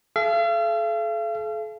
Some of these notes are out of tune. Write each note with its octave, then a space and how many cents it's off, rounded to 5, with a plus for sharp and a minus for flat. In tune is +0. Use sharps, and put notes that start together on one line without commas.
A4 -40 F5 -45